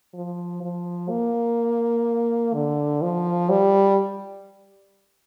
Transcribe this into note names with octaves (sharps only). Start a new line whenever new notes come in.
F3
F3
A#3
D3
F3
G3